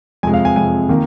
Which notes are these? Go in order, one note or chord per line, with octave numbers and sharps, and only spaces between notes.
F2 C3 G#3 G#5
F5
G#5
F2 C3 G#3 G#5
D#3 A#3